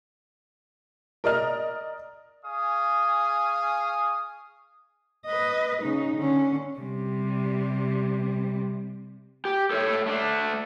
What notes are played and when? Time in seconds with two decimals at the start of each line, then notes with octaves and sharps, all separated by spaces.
1.24 A#4 D5 D#5 F6
2.46 G#4 F5 G#5 C#6 D#6
5.26 B4 D#5
5.82 C#3 D#4
6.16 D3 C#4
6.80 C3 G3
9.45 G4
9.71 A4 C#5 D#5 E5
10.06 A3 D4